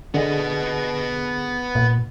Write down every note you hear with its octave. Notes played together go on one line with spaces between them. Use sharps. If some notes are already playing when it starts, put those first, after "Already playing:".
D3 B3 G#4 D#5
A#2